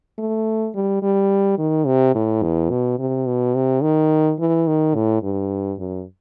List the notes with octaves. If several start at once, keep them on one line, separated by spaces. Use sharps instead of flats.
A3
G3
G3
D#3
C3
A2
E2
B2
C3
B2
C3
D#3
E3
D#3
A2
G2
F#2